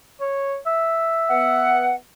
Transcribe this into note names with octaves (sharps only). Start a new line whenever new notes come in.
C#5
E5
B3 F#5